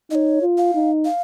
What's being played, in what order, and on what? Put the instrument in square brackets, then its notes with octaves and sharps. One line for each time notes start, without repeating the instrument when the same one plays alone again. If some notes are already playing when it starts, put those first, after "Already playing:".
[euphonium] D#4 [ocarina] C#5 D#5
[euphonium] F4
[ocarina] F5
[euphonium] D#4
[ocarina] F5